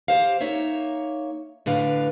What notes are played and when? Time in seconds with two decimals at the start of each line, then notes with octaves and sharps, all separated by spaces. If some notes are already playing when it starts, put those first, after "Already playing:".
0.08 G4 A4 C5 F5
0.41 A#3 D#4 C#5 E5
1.66 A2 D3 B4 F5